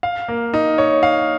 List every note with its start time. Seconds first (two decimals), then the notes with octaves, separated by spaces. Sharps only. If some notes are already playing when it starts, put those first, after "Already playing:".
0.03 F5
0.28 A#3
0.54 D#4
0.78 C#5
1.03 F5